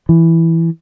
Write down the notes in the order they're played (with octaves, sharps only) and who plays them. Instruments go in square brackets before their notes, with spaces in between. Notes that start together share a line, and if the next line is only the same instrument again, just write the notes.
[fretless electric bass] E3